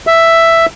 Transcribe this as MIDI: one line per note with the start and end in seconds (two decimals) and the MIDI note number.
0.07 0.66 76